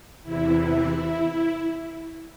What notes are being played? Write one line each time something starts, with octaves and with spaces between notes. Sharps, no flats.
E2 C3 E3 E4